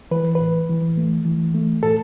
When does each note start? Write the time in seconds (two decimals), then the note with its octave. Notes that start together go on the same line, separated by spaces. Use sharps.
0.11 E3 B4
0.35 B4
0.41 A2
0.69 E3
0.97 A3
1.25 E3
1.54 A3
1.83 A2 A4